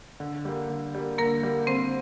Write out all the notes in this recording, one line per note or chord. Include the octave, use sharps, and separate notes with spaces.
D3
G3 A#3
D3
G3 A#3
D3 A#3 A#4
G3 A#3
D3 C4 C5